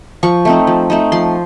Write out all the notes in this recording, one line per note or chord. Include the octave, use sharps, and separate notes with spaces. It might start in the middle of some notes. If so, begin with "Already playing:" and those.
F3 C#6
A3 C4 D#4
F3
A3 C4 D#4
F3 C6